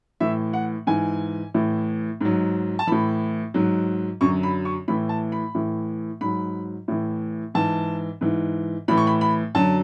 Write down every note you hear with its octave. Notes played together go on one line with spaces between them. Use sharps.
A2 E3 E5
F#5
G#2 E3 G#5
A2 E3
G#2 F#3
A5
A2 E3 B5
G#2 F#3
F#2 D3 F#3 C#6
B5
C#6
A2 E3 B5
A5
B5
A2 E3
G#2 F#3 B5
A2 E3
G#2 E3 A5
G#2 E3
A2 E3 B5
C#6
B5
B5
F#2 D3 F#3 A5